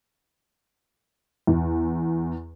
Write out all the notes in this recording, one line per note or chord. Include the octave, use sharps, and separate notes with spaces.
E2